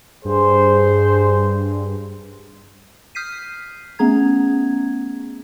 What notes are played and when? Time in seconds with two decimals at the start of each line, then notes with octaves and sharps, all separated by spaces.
0.25 G2 G#4 C5
3.15 D#6 F6 G6 B6 C7 D#7
3.99 A3 B3 C#4 G#4 A#5 G#6